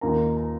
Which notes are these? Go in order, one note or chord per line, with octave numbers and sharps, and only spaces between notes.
D#2 D#3 A#3 F4 A#5
A#5